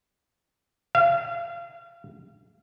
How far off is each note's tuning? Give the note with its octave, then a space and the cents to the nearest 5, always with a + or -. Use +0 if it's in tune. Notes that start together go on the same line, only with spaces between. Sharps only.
F5 -35